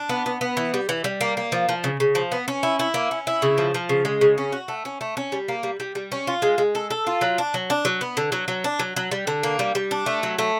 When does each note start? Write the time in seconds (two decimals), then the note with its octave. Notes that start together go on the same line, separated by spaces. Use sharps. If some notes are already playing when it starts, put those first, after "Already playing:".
Already playing: D4
0.09 B3
0.26 B3
0.41 B3
0.57 E3
0.74 G3
0.89 E3
1.04 G3
1.21 A#3
1.37 A#3
1.52 F3
1.69 F3
1.84 C#3
2.00 C#3
2.15 F3
2.32 B3
2.48 C#4
2.63 E4
2.79 E4
2.94 A#3
3.11 C#4
3.27 E4
3.42 C#3
3.58 F3
3.74 F3
3.89 C#3
4.05 G#3
4.21 C#3
4.38 C#4
4.52 F#4
4.68 A3
4.85 C#4
5.01 A3
5.17 C#4
5.32 G3
5.48 A#3
5.63 G3
5.80 G3
5.95 G3
6.12 C#4
6.27 F4
6.42 G#3
6.58 G#3
6.75 A4
6.90 A4
7.07 F4
7.21 F#3
7.38 D4
7.54 F#3
7.70 D4
7.85 F#3
8.01 B3
8.17 D3
8.32 F#3
8.48 F#3
8.64 D4
8.79 F#3
8.96 F#3
9.11 G3
9.27 D3
9.43 A#3
9.59 G3
9.75 G3
9.91 D4
10.06 A3
10.23 F#3
10.39 A3